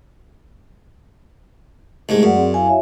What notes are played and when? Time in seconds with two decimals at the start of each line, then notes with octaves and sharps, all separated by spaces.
2.09 C2 G#2 G#3 A3 G#4
2.23 F#2 A#4 D5 F#5
2.36 C4 G#4 D5
2.54 E4 F5 G#5
2.68 F#4 C#5 E5